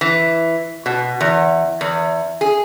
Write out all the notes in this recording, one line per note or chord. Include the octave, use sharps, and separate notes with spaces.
E3
B2
E2
E2
G#4